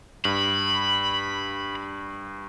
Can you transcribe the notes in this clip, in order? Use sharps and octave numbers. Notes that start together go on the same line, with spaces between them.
G2 B5